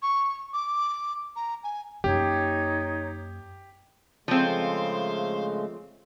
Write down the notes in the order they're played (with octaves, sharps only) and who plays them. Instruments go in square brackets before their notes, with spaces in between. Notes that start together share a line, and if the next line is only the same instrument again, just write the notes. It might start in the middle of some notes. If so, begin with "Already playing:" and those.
[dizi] C#6
D6
A#5
G#5
[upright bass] F#2 A#3 [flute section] D#4 C#5 [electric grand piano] G4
[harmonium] C#3 G#3 A3 [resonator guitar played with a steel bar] F3 C4 [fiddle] C5 F5